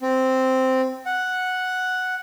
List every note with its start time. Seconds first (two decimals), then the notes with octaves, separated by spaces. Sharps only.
0.01 C4
1.06 F#5